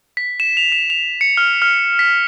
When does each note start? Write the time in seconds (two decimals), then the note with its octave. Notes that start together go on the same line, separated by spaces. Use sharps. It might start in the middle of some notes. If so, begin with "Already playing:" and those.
0.17 B6
0.40 E7
0.57 F7
0.72 E7
0.90 F7
1.21 C#7
1.37 F6
1.62 F6
1.99 B6